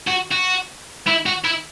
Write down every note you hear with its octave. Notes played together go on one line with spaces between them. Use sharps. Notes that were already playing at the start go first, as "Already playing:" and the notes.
F#4
F#4
E4
F#4
E4